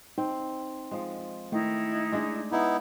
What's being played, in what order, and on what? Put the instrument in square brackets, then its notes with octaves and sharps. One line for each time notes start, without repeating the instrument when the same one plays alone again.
[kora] C4 [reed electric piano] D#4
[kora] F3 G#3
[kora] D#3 [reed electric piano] A3 [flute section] D#4 E4
[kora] G#3 D4 G#4
[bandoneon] B3 D#4 E4